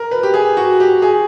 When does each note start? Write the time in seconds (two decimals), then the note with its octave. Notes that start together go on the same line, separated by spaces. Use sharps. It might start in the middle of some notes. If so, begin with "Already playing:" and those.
Already playing: A#4
0.11 B4
0.23 G4
0.34 G#4
0.57 F#4
0.80 G4
1.02 G#4